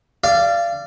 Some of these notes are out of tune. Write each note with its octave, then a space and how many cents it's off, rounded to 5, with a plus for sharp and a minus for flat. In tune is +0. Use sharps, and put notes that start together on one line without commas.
D5 +0 F5 -30